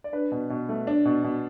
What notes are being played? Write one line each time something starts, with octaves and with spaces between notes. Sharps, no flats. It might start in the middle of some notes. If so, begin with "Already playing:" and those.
D5
D4 B4
B2
B2
A3
D4
B2
B2